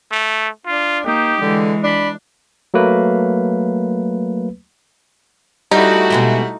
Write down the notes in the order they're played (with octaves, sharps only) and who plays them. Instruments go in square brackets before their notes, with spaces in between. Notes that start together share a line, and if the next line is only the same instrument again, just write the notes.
[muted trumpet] A3
[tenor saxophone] D4 [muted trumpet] F4
[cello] A#3 [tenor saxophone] D#4 [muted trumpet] G4
[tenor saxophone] D3 [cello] E3 G#3
[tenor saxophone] D4 [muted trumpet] B5
[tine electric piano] F#3 A3 A#3 B4
[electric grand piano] G3 [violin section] A3 E4 F#4 [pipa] D#4
[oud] B2 G#3 G4